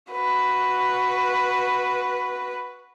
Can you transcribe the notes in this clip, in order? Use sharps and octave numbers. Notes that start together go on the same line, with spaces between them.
F#4 B4